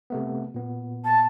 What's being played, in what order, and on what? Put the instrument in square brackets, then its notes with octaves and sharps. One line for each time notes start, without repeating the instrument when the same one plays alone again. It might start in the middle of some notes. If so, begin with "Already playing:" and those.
[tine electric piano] C3 A3 B3
A#2 B3
[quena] A5